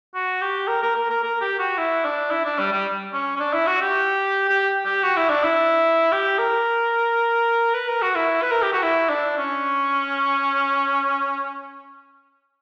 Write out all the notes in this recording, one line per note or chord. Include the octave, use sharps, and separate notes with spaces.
F#4
G4
A#4
A#4
A#4
A#4
A#4
G4
F#4
E4
D4
E4
D4
G3
G3
C#4
C#4
D4
E4
F#4
G4
G4
G4
F#4
E4
D4
E4
G4
A#4
B4
A#4
F#4
E4
B4
A#4
G4
F#4
E4
D4
C#4